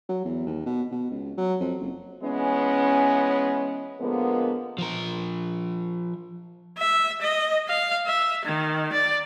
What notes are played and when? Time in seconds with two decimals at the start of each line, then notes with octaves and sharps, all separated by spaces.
0.09 F#3
0.25 E2
0.47 D#2
0.66 B2
0.92 B2
1.11 C#2
1.37 F#3
1.61 F2
1.81 F#1
2.23 E3 G#3 B3 C#4
4.00 D3 F3 G#3 A#3 B3
4.78 F3 A#4
6.78 E5
7.22 D#5
7.69 F5
8.06 E5
8.45 D#3
8.93 D5